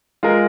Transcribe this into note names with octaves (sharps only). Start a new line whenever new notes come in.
G#3 F4 A#4